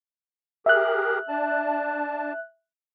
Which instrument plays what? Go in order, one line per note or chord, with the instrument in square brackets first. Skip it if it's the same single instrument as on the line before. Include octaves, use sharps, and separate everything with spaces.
[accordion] G4 G#4 A#4 [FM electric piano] E5 F#6
[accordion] D4 A5